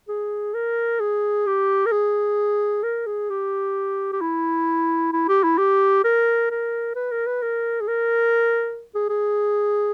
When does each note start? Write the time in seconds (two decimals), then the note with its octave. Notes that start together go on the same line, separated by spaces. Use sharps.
0.08 G#4
0.54 A#4
1.00 G#4
1.47 G4
1.86 A#4
1.92 G#4
2.83 A#4
3.07 G#4
3.30 G4
4.13 G4
4.21 E4
5.12 E4
5.28 G4
5.44 E4
5.58 G4
6.04 A#4
6.51 A#4
6.95 B4
7.12 A#4
7.26 B4
7.42 A#4
7.81 G#4
7.88 A#4
8.95 G#4
9.09 G#4